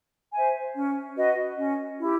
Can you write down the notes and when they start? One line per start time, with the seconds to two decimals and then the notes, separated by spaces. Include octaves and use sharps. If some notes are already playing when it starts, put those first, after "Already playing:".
0.34 C5 E5 G#5
0.75 C#4
1.17 F#4 B4 D#5
1.58 C#4
2.00 E4 G4